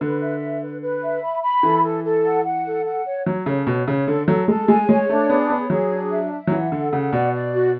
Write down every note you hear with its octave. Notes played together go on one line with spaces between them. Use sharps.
D3 B4
E5
B4
B4
B4
E5
B5
B5
E3 A4
A4
A4
F#5
F#5
A4
F#5
C#5
F#3 C#5
C#3 A4
B2 C#5
C#3 C#5
D3 A4
F#3 A4
G#3 A4
G#3 G#5
G#3 C#5
A3 D4
B3 G#4
B3 C#5
F#3 G#4
D4
E5
E5
F#3
E3 F#5
D3 A4
C#3 F#5
B2 D5
D5
F#4